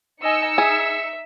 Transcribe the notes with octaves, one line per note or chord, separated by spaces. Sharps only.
D#4 D#5 G#5 E6 C#7
G#4 E5